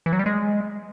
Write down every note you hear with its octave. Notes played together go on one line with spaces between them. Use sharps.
E3
F#3
G3
G#3